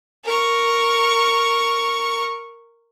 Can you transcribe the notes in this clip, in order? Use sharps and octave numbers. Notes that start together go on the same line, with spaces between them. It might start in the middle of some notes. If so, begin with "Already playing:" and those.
A#4 C#6